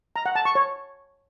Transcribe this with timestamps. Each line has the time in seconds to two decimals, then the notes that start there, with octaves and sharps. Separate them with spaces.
0.16 A#5
0.26 F#5
0.35 A5
0.45 C#6
0.55 C#5